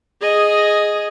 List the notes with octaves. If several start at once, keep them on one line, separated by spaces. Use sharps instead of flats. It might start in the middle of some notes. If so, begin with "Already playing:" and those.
G#4 D#5